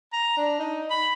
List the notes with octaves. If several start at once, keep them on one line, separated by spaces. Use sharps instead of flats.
A#5
D4
D#4
B5